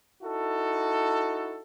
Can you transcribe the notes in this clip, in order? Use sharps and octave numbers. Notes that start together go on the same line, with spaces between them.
D#4 E4 F#4 A4